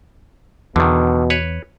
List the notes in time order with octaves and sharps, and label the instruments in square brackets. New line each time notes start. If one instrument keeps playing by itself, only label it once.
[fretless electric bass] E2 [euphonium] B2 [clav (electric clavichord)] D3 D#3
[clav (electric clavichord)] B4 C#5